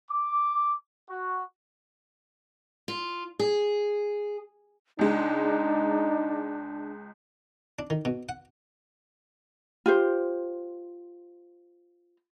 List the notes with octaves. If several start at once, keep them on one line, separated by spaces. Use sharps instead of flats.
D6
F#4
F4
G#4
C#2 G#3 D4 D#4
D4
D#3
B2
F#5
F4 G4 C5